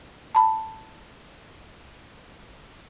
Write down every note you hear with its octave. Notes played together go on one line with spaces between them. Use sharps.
A5 B5